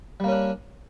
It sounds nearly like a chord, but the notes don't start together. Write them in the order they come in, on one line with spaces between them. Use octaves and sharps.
G3 A#3 C#4 D4